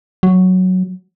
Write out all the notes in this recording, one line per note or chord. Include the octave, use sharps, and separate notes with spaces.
F#3